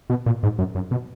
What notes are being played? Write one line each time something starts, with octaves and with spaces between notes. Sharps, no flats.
B2
A#2
G#2
F#2
F#2
B2